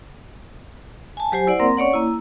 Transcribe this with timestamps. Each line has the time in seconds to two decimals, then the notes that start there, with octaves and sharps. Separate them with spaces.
1.17 G#5 A5
1.32 F#3 G4 C5 G#5
1.47 E4 C5 D5 F#5
1.60 A#3 C4 A#4 C6
1.77 C#4 C#5 D5 F#5
1.93 A#3 E4